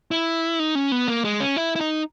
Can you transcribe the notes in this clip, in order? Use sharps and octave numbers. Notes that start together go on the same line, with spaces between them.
E4
D#4
C#4
B3
A#3
G#3
C#4
E4
E4
D#4